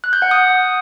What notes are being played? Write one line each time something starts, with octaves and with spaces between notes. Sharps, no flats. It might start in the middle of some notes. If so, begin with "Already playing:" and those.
F#6
G6
F#5
D#6